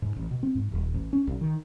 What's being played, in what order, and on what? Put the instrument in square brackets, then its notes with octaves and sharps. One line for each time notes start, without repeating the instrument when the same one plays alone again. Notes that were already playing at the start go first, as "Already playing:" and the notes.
[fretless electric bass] G#2
A1
B2
C4
G#2
D#1
A1
C#4
B1
D#3